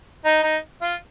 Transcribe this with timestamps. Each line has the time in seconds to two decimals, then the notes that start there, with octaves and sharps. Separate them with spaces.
0.25 D#4
0.43 D#4
0.82 F4